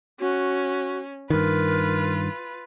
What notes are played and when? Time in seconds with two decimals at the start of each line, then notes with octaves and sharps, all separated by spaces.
0.20 C#4 F#4
1.30 G2 D#3 F4 A#4 B4